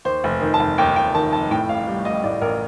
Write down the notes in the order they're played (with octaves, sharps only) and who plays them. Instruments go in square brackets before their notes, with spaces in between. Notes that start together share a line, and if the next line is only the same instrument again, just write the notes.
[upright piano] D#2 C5
F1
D#3
A5
F1
D#2 G5
F1 G5
D#3 A5
F1 A5
A2 G5
A1 F5
G3
A1 D#5
A2 D5
A1 A#4